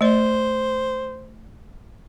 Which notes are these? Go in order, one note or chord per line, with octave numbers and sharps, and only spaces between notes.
A3 C5 D5